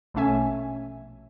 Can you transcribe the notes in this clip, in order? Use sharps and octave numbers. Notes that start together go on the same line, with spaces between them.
A#1 B2 A3 C#4 E5 G#5